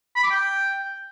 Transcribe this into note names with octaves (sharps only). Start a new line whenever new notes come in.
B5
D6
G5